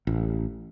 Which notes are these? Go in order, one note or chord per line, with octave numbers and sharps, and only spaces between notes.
A1